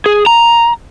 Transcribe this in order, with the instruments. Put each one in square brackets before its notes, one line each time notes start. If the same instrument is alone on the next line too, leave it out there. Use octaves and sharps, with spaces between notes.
[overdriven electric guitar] G#4
A#5